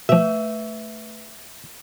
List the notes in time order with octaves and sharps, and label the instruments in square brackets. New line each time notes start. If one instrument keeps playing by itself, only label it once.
[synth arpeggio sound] B2 F3 [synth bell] A3 B4 [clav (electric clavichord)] E5